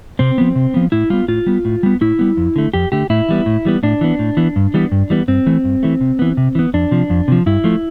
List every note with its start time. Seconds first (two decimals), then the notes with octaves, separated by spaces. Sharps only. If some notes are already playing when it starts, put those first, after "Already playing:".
0.19 C3 C4
0.38 F3 B3
0.56 C3
0.74 F3 B3
0.92 A2 E4
1.10 G3 B3 F4
1.28 A2 F4
1.46 G3 B3
1.65 A2
1.83 G3 B3
2.01 A2 E4
2.19 G3 B3
2.37 F2
2.56 D3 A3
2.74 F2 G4
2.92 D3 A3 G4
3.10 A2 E4
3.29 E3 G3 B3
3.46 A2
3.65 E3 G3 B3
3.83 A2 D4
4.01 E3 B3
4.19 A2
4.37 E3 B3
4.56 G2
4.74 E3 G3 B3
4.92 G2
5.10 E3 G3 B3
5.28 G2 C4
5.46 E3 A3
5.64 G2
5.83 E3 A3
6.01 C3
6.19 E3 B3
6.37 C3
6.55 E3 B3
6.74 F2 D4
6.91 C3 F3
7.10 F2
7.28 C3 F3
7.46 G2 E4
7.64 F3 A3